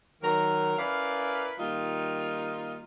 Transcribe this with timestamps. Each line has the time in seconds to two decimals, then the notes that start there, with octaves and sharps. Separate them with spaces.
0.22 D#3 F#3 A#4
0.78 C#4 E4 A#4 B4 D5 F5
1.59 D#3 G3 A#3 D#4 F4